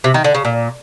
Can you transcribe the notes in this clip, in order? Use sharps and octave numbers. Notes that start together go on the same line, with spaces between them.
C3
D#3
D3
C#3
A#2